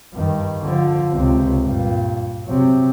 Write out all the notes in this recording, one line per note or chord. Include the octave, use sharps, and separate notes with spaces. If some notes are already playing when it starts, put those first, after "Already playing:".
G2 D#3
D3 F3
C#2 C3
G2 A#2
C3 F#3